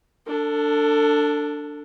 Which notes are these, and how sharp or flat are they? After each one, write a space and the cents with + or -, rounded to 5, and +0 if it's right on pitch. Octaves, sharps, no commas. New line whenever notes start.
D4 +0 A4 +30